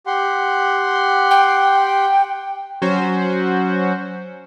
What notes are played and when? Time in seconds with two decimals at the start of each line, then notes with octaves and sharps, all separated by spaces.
0.07 G4 F#5 C6
1.31 G5
2.82 F#3 C#4 F#4 C5